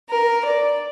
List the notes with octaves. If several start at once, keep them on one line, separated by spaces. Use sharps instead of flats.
A#4
D5